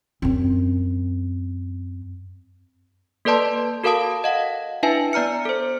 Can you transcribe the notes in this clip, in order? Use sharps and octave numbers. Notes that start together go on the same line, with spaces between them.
F#2 C4
A#3 A4 B4 D5 A5 C6
F#4 A4 A#4 F5 A5 D#6
D#5 F5 F#5
D4 E4 B4 E5 G#5
B3 D5 A#5 F6 C#7
A4 C5